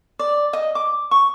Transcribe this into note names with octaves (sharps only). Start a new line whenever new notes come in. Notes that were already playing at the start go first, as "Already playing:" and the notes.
D5
D#5
D6
C#6